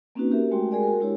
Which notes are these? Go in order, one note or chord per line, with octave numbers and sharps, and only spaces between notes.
A#3 C4 C#4 D#4 F#4 B4
F#4 G4 A#4 E5
G#3 A3 F#4 G5 C6
G#3 F#4 G#4 A#4 D5 G#5
F#4 A#4
G#3 D4 E4 F#4 G4 C#5